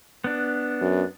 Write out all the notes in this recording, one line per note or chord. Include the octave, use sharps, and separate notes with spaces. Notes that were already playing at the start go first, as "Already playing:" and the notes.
B3 D4
F#2